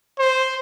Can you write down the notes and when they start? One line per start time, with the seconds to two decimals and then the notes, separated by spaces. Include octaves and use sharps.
0.19 C5